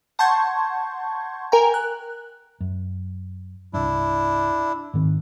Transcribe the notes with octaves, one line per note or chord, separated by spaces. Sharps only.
F#5 A5 C6 C#6 G6 G#6
A#4 G5 G#5 A#5
F#6
F#2
C2 G2 D4 E4
G#2 D#3 C4